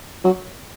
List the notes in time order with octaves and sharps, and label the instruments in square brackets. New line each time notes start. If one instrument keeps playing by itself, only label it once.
[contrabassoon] F#3